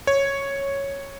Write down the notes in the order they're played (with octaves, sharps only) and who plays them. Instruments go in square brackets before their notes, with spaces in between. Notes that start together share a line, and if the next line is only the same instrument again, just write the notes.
[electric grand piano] C#5